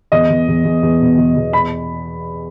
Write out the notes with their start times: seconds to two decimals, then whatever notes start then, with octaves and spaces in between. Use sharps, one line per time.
0.12 E2 D#5
0.30 E2
0.48 E2
0.65 E2
0.83 E2
1.01 B2
1.18 E2
1.36 E2
1.53 B5